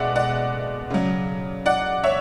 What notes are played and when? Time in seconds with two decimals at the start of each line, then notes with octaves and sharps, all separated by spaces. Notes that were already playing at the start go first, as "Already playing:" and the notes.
Already playing: B2 G#3 D5 E5 F#5
0.16 D5 F#5
0.90 C#3 F#3
1.66 D5 F#5
2.04 C#5 E5